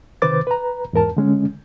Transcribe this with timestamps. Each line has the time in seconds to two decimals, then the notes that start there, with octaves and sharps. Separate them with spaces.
0.22 C3 D#3 B4 C5 D6 A6
0.47 B4 A#5
0.93 E2 G#2 A#4 A5
1.17 D3 G#3 C#4